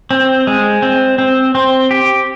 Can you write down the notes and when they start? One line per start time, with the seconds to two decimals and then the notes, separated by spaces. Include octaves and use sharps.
0.11 C4
0.47 G#3
0.82 C4
1.18 C4
1.55 C4
1.91 G4